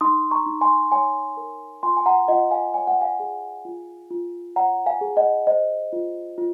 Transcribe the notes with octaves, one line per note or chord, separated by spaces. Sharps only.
D#4 C6 D#6
A#5 C#6
D#4
G#5 C6
C#5 G#5 C6
A#4
F4 G#5 C6
G#5
F#5 A#5
F4 D#5 F#5
F5 G#5
C#5 G#5
F#5
F5 G#5
G#4
F4
F4
C#5 F#5 A#5
F5 G#5
G#4
D#5 F#5
C5 D#5
F4
F4